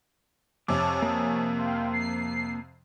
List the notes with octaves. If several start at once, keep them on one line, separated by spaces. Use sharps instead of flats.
F2 C3 C#5 G#5 A5 D6
A#3 D#6
F5 G5 C6
C7